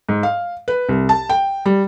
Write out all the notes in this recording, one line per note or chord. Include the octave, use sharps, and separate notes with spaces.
G#2
F5
B4
C2
A5
G5
G3